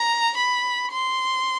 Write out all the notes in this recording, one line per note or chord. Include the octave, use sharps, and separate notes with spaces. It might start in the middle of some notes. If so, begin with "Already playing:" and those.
Already playing: A#5
B5
C6